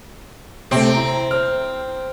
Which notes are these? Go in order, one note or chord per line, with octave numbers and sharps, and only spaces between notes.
C3 A3 C4
E4 A#5
C5 F6